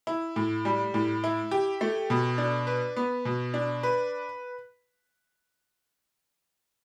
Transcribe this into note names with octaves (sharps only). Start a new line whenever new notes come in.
E4
A2
G3
A2
E4
G4
A3
B2
D4
B4
B3
B2
D4
B4